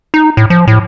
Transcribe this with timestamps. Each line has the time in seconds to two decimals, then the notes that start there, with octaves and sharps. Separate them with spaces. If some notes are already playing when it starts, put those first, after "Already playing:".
0.14 D#4
0.37 A2
0.50 F3
0.67 A2